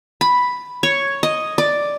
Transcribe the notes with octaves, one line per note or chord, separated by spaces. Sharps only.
B5
C#5
D#5
D5